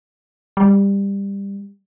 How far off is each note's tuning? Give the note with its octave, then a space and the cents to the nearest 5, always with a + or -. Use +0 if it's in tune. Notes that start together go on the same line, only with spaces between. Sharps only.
G3 +20